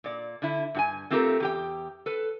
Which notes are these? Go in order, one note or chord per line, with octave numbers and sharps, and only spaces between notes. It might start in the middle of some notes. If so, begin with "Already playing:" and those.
A#2 D5
D3 E4
G2 F#4 G#5
A3 C4 F4 G4 A4 A#4
E2 G4 G5
A4 B4